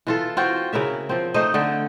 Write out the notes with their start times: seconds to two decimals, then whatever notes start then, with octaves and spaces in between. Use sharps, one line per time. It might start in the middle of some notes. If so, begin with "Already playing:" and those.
0.07 E3 F4 A4
0.37 C4 F4 F#4 G5
0.73 C#3 E4 A#4 E5
1.09 F3 C4
1.34 A3 D#4 C5 D#5
1.54 D3 A3 G5